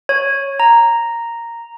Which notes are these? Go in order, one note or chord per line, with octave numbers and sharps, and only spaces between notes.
C#5
A#5